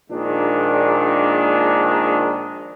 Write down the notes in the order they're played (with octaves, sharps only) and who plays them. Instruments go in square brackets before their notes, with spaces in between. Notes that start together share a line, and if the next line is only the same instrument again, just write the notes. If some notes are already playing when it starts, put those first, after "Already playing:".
[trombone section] A#1 A#2 D#3 G#3 D4